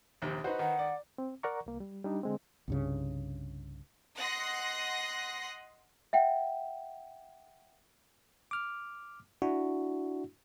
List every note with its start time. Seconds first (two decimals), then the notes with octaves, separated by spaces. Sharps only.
0.22 A#1 D#2 C3
0.44 D#4 F#4 B4 C5
0.59 D#3 F#5
0.79 D5
1.18 C4
1.43 A#4 D5 F#5 A#5 C#6
1.66 C2 A#3
1.80 G3
2.04 G3 D4 D#4
2.23 D3 G#3 C4
2.68 C2 G2 C#3
4.18 D#5 F#5 C6 D#6 F#6 A#6
6.13 E5 F#5 G5
8.51 D6 F6
9.42 D4 E4 F#4